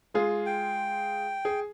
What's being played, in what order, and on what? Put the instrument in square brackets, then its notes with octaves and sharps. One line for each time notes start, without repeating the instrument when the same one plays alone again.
[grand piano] G#3 F4 G#4
[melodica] G5
[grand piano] G#4